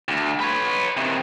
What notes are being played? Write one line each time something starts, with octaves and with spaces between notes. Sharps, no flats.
D2
B4 C#5
C3 D#3